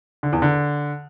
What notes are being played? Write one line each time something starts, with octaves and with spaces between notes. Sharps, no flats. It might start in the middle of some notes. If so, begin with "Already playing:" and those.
D3
E2
D3